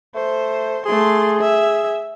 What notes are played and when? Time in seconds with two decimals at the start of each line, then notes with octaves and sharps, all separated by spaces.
0.15 A3 C5
0.86 A3 G#4 C6
1.40 E5